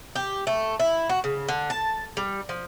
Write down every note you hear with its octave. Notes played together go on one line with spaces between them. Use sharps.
G4
A3
E4
F#4
C#3
D3
A5
G3
F3